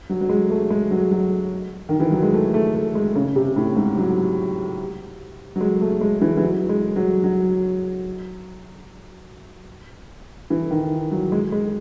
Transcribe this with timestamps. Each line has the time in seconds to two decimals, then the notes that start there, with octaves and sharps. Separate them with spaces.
0.09 F#3
0.21 F#3
0.29 G#3
0.50 A3
0.70 G#3
0.91 F#3
1.11 F#3
1.89 D#3
2.00 E3
2.11 F#3
2.23 G#3
2.34 A3
2.54 A3
2.75 A3
2.95 G#3
3.16 C#3
3.36 C3
3.56 A2
3.76 G#2
3.97 F#3
5.56 F#3
5.61 G#3
5.81 A3
6.01 G#3
6.21 E3
6.37 E3
6.42 F#3
6.69 G#3
6.96 F#3
7.24 F#3
10.50 E3
10.71 D#3
11.12 F#3
11.32 G#3
11.52 G#3